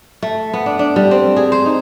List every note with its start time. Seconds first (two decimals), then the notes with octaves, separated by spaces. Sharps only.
0.22 A3
0.54 B3
0.66 D4
0.79 D4
0.96 G3
1.11 C4
1.37 G#4
1.52 C5
1.66 D#4